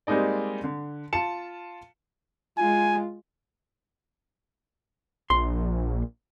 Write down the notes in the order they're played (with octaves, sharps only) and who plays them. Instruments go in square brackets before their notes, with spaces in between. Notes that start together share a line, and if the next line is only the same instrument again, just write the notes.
[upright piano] G3 G#3 A#3 C4 D#4 D5
D3
F4 A5 C#7 E7
[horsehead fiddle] G#3 F4 [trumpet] G#5
[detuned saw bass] A#1 [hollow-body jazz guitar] C6